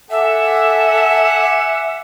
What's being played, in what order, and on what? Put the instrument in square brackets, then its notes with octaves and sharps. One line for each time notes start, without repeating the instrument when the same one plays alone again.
[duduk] A4 [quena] E5 [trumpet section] F#5 G#5 D6